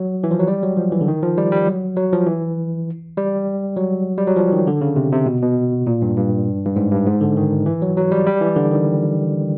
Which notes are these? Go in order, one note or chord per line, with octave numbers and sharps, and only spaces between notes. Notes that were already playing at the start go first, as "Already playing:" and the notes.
Already playing: F#3
E3
F3
F#3
G3
F#3
F3
E3
D3
D#3
F3
G3
G3
F#3
F#3
F3
E3
G3
F#3
G3
F#3
F3
D#3
D3
C#3
C3
C3
B2
B2
A#2
G2
G2
G2
G#2
G2
G#2
D3
D#3
E3
F#3
F#3
G3
G3
E3
D3
D#3